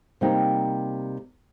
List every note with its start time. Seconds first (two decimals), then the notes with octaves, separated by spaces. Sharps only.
0.21 C3 G3 A#3 D#4 G4